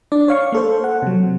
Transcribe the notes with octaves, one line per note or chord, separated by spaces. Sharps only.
D4 D5
C#5 F5 C#6
A#3 A4 C5
F#5
C3 F#3